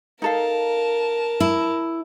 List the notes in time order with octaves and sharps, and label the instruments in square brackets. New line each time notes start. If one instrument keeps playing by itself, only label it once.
[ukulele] D#4 A4 F5 [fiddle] A#4 A5
[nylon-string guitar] E4